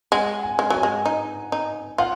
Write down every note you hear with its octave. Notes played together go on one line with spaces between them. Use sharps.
G#3 F#5
G#5
G#3
F#3 G#5
G#3
D#4
D#4
F4 F#5